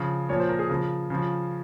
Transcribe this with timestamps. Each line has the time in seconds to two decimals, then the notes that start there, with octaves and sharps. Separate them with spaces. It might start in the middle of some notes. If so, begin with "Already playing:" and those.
Already playing: C#3 F3
0.29 A#2 F3 C#5
0.40 C5
0.49 A#4
0.59 G#4
0.69 C#3 F3 A#4
1.10 C#3 F3